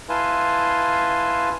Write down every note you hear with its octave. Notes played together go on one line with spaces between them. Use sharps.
E4 B4 F5 G#5 A5 C6